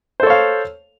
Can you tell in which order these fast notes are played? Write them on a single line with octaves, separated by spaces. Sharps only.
C5 A4 C#5 F5